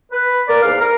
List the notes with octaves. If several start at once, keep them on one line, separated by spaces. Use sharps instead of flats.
B4
A#3 A#4 D5
E2 G#2 F5
A#4